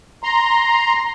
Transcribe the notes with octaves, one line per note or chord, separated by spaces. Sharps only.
A#5 C6